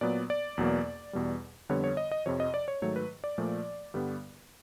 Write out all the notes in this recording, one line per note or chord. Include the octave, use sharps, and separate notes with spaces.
A#2 F#3 B3 D5
D5
E2 B2 F#3 A#3
E2 B2 G3
F2 D3 G3 B3 C#5
C#5
D#5
D#5
F2 C3 F3 C#5
D#5
D5
C#5
G#2 D#3 F#3 A3 C#5
B4
D5
A#2 F3 A3
G2 D3 G3 B3